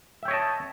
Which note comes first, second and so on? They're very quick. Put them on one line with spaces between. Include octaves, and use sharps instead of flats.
E5 G5 C#5 D#5 A5